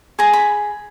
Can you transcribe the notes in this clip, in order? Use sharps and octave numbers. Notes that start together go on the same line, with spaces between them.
G#4 A#5
B5